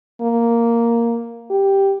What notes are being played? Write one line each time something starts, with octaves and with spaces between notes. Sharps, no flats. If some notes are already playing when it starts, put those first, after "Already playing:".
A#3
G4